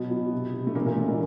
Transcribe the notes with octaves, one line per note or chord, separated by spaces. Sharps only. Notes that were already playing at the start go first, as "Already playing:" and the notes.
Already playing: B2 F#3 B3
B2
C3
C3
A3
A#2 E3 A#3
A#2 A#3
E3 A3
G#3